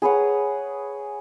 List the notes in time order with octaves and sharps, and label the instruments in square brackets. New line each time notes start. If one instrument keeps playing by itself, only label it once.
[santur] G#4 B4 C#5 F#5